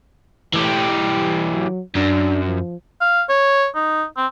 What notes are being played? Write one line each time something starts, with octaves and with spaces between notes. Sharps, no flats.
A2 E3 G4
G3
F#3
F#2 D4
F3
F5
C#5
D#4
C4